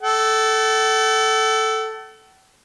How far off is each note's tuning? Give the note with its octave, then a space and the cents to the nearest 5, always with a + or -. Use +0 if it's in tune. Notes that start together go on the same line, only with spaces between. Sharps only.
A4 +0 F#5 +45